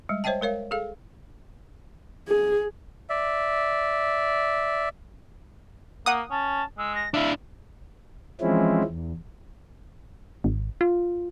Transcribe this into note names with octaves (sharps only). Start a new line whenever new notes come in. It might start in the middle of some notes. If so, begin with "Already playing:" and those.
G3 G#3
C5 C#5 D#5 E5 G5 A5
G#3 A#4 C#5 F5
G#4 A4 F5
G#4
D5 E5
A#3 F#5 D#6
C#4 A5
G#3 E6
A#6
D4 E4 E5 F5
E3 F3 G#3 C4 C#4 E4
E2
G#1
F4